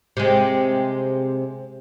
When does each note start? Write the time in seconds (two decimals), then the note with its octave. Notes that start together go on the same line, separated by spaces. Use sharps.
0.17 C3 G#3